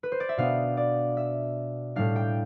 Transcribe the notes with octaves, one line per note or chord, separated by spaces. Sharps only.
B4
C5
D5
E5
B2 B3 D4 F5
D5
E5
A2 G3 D4 F5
G5